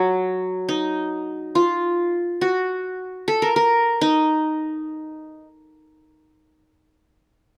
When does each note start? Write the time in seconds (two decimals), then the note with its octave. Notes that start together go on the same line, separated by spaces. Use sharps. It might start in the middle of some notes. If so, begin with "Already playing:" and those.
Already playing: F#3
0.69 D#4
1.55 F4
2.41 F#4
3.28 A4
3.42 A#4
3.56 A#4
4.01 D#4